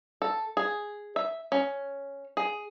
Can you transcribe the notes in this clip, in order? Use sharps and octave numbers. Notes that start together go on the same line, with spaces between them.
A4
G#4
E5
C#4
G#4